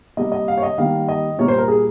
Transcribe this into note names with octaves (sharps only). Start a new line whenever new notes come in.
C3 G3 A#3 D#5
D#5
F5
C#5
D#5
D#3 G3 A#3 F5
D#5
A#2 G3 A#3 C#5
C5
A#4
G#4